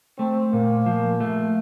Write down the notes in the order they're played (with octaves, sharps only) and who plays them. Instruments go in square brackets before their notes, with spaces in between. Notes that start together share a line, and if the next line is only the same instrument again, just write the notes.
[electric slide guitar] A3 [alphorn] C4
[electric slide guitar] A#2 [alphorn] A#3
[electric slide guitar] F3
A3